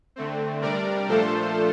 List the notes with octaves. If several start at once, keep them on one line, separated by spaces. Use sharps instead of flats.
D3 A3 C4
C3 G3 D4 A#4 D5
A#2 F3 A3 D4 F4 A4 C5